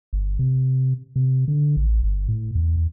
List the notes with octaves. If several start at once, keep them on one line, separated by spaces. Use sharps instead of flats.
G1
C3
C3
D3
A1
G1
A2
E2
E2